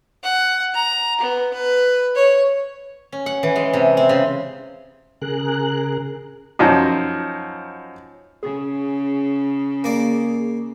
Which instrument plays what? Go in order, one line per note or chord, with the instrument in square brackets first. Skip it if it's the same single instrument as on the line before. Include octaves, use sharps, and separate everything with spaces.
[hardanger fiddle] F#5
A#5
B3
B4
C#5
[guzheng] C#4
F#5
E3
G#3
C3
C4
C#3
[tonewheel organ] C#3 G#4 A#4 F#6
[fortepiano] F#2 F3 D#4
[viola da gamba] C#3 [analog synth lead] G#4
[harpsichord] A#3 D5